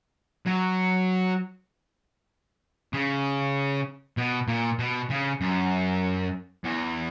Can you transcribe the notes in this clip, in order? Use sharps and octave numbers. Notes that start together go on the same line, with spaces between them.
F#3
C#3
B2
A#2
B2
C#3
F#2
E2